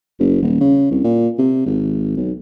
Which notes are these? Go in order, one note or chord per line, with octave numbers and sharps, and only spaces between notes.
F#1
D#1
C#3
C2
A#2
C3
G#1
B1